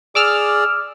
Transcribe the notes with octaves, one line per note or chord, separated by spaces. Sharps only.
G#4 D5 D6 E6 F6